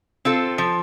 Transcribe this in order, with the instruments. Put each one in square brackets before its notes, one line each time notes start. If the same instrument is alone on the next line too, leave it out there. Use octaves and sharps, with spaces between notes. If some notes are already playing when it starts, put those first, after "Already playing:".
[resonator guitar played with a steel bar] C4 F4 A4
F3